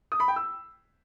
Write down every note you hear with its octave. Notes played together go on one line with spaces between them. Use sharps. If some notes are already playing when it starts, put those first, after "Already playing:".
D#6
B5
G5
E6